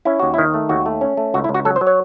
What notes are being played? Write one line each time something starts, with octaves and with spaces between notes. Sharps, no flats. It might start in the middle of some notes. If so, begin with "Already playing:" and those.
C#4 E4
D#2 F#4
D#3 E4
A3
D#2 F#4
A3
C#4
A3
C#2 F#4
E4
C#2
F#4
F#3 A4
C5
F#3
C#5